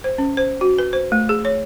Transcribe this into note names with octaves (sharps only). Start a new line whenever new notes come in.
C5
C#4
C5
F#4
B4
C5
A3
G#4
C#5